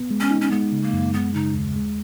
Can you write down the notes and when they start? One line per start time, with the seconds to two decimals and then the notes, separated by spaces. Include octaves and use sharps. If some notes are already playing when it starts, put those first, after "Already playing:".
Already playing: B3
0.11 G#3
0.20 C#4
0.31 D#4
0.41 C#4
0.51 G#3 B3
0.72 C#3
0.83 A#3
0.93 F#2
1.13 G#3 B3
1.34 C#3 D#4
1.54 D#2
1.76 G#3